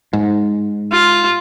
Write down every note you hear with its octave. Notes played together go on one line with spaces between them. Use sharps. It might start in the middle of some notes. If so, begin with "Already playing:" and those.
G#2
F4